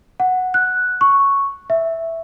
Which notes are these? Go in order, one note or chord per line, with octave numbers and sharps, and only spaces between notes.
F#5
F#6
C#6
E5